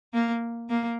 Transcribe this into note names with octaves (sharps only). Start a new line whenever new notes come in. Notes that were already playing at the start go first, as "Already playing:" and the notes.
A#3
A#3